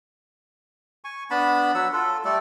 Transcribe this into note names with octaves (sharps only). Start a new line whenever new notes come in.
G#5 C#6
B3 D4 A5 B5
F#3 F#5 E6
F4 A4
G3 A3 A4 D5